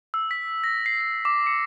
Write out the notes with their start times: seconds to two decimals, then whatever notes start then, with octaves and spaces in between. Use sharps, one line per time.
0.14 E6
0.31 B6
0.64 A#6
0.86 C7
1.01 C7
1.25 D6
1.47 C#7